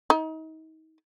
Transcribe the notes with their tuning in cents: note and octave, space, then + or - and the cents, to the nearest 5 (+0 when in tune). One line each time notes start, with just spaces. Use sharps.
D#4 +35